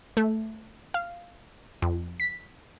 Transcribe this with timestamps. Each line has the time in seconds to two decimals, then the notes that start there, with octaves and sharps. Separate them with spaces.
0.17 A3
0.94 F5
1.82 F2
2.20 B6